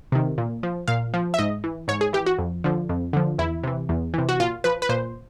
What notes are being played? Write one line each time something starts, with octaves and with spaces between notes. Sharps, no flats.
C3 D#3
A#2
F3
A#2 F5
F3
E5
G#2 D#5
E3
G#2 C#5
G#4
E3 G4
F#4
F2
D3 F3
F2
D3 F3
E2 E4
C3 E3
E2
C3 E3
F#4
A#2 F4
F3 B4
B4
A#2 C5